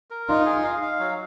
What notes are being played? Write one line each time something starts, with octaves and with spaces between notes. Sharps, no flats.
A#4
D#4 F4
G#4
F5
F5
F#3